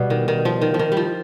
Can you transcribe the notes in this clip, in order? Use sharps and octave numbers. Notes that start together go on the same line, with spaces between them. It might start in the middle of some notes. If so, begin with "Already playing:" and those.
Already playing: B2 G3 B3
D#3
D#3
F3
D#3
F3
D#3
G3
F3